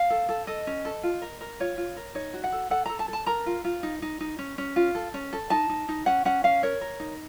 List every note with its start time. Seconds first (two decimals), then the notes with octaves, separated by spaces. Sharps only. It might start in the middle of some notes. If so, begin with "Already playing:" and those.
Already playing: F5
0.10 A4
0.29 A4
0.47 A4 D#5
0.67 C#4
0.85 A4
1.03 F4
1.22 A#4
1.41 A#4
1.60 F4 C#5
1.78 F4
1.97 A#4
2.15 D#4 C#5
2.34 F#4
2.44 F#5
2.52 A4
2.71 A4 F#5
2.86 A4 A#5
2.99 A5
3.08 A4
3.13 A5
3.26 A#4 A#5
3.46 F4
3.64 F4
3.83 D#4
4.02 D#4
4.20 D#4
4.39 C#4
4.58 C#4
4.76 F4
4.95 A4
5.14 C#4
5.33 A4
5.50 D#4 A5
5.69 D#4
5.89 D#4
6.06 C#4 F#5
6.25 C#4 F#5
6.44 C#4 F5
6.63 A#4 C#5
6.81 A#4
7.00 D#4